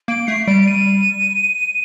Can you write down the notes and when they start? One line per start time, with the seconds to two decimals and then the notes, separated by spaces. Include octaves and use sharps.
0.08 A#3 D7
0.27 A3 C7
0.47 G3 D7
0.67 D#7